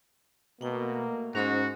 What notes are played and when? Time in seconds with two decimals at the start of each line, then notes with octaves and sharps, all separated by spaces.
0.61 B2 A3 A#3 F#5 G5
1.35 G#2 C#4 F#4 C5 B5